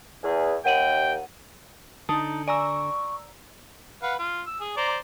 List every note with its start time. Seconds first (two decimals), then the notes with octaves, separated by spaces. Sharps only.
0.23 E2 G#4
0.65 D#2 F#5 G5 D#7 F#7
2.09 D3 D#4 A5 D#6
2.48 D5 G#5 A#5 C#6 E6
4.02 B4 F5 F#5
4.19 F4
4.46 E6
4.60 G#4
4.77 C5 D5 A#5